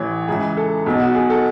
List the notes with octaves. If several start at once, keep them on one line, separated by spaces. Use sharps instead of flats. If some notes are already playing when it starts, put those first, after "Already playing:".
Already playing: A1 A2 E3 C#5
C#2 C#3 E3 G#4
A4
B1 B2 G#4
F#4
G#4
A4